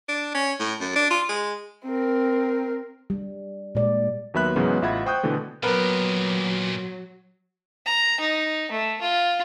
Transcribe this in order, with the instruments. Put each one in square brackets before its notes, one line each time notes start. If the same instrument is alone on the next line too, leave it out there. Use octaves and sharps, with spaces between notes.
[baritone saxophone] D4
C#4
A2
F#2
D4
F4
G#3
[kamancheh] C4 A#4
[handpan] G3
A#2 G#3 D5
[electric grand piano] D#2 F#3 B3 E5 B5 F#6
G#2 C#3 E3 F#3 B3 D#4
A1 F4 E5 F#5 B5 G#6
C5 G5 C#6 D#6 F#6 G6
B2 D3 E3 A3
[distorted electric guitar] A#2 G4 [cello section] F#3 [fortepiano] B3 A#4 B4
[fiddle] A#5
D#4
A3
F4